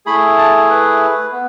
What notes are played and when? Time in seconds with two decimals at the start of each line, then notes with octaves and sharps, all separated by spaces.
0.06 A3 E4 G#4 B5
0.38 A5
0.70 B4
1.32 B3